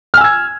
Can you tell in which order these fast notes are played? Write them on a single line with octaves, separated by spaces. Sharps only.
F6 G#5 E6 G#6